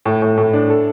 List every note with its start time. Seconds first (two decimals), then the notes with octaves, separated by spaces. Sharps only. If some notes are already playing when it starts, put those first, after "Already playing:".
0.05 A2
0.22 A2
0.37 A2
0.53 D4
0.70 A4